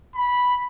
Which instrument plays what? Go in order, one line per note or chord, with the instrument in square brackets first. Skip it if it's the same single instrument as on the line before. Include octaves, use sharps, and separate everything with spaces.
[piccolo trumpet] B5